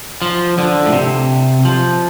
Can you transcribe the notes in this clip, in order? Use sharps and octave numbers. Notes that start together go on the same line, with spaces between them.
F3
D3
A2
C3
F3